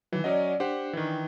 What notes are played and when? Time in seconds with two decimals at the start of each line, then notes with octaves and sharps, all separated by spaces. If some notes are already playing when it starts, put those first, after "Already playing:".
0.13 D#3 E3 F#3
0.24 F#3 C#4 D5 D#5 F#5
0.60 D4 G4 C5 F#5
0.93 D#3 E3